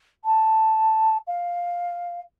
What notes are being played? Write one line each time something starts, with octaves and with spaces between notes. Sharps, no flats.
A5
F5